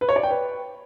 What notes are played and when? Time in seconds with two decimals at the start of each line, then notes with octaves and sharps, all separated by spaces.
0.01 B4
0.09 C#5
0.16 D5
0.23 G5
0.31 B4